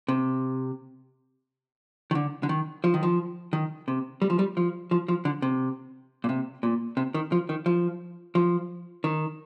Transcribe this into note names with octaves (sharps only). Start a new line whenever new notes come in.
C3
D#3
D3
D3
D#3
F3
D#3
F3
D#3
C3
G3
F3
G3
F3
F3
F3
D3
C3
A#2
C3
A#2
C3
D#3
F3
D#3
F3
F3
D#3